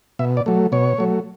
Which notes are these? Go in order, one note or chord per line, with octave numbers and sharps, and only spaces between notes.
B2 E5
D5
F#3 A3
B2 C#5
F#3 A3